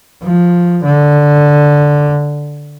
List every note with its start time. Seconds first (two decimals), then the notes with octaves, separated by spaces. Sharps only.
0.23 F3
0.84 D3